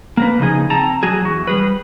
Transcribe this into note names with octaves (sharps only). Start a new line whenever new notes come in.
A#3 A#4 B4
C#3 F3 D#4 G#4
C4 G5 A5 A#5
F#3 F#4 G#4
E2 F#4
G3 G#4 B4